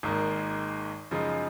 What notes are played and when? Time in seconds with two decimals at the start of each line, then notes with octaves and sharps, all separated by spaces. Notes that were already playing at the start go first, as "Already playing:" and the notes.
0.03 G#1 G#2 D#3 A#3
1.11 F#2 C#3 F3 G#3 D#4